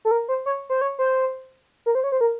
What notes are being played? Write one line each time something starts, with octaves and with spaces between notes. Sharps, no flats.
A4
A#4
C5
C#5
C5
C#5
C5
A#4
C5
C#5
C5
A#4